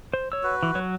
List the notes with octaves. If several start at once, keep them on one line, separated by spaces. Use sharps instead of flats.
C5
C#5 E6
F#4 B4
E3
F#3 C#5